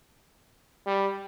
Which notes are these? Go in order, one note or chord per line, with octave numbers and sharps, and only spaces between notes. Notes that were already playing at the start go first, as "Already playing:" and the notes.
G3